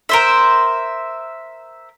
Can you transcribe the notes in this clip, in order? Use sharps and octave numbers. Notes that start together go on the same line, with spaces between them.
A#4 C5 E5